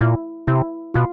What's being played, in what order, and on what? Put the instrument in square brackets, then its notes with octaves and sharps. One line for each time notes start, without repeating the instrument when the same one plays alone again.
[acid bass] A#2 [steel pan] E4
[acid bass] C3 [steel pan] E4
[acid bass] B2 [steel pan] F4